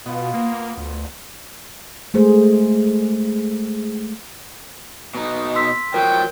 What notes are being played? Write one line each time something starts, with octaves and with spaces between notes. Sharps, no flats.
B2 B3 F4
A#3
D2
G#3 A3 G#4 C5
B2 D#4
C6 E6 B6
F3 F#3 A#4 G5